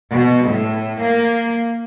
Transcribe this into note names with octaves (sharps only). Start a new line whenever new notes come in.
B2
A2
A#3